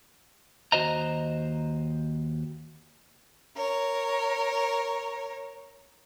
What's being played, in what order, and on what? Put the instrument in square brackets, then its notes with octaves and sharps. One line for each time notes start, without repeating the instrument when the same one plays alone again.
[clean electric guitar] D#2 F#4 C5 D#5 A#5
[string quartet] A#4 C#5